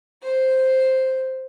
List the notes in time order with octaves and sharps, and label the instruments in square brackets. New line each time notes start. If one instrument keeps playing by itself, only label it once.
[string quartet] C5